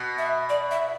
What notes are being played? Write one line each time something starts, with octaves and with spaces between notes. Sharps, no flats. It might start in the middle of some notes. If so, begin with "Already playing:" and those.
Already playing: B2
E5
D5
E5